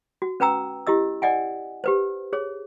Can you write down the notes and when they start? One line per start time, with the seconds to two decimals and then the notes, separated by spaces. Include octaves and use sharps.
0.22 F#4
0.40 C#4 B4 G5 A#5 E6
0.87 E4 G4 D#5 E6
1.22 D5 D#5 F#5 G#5
1.84 G4 B4 C5
2.33 G#4 C#5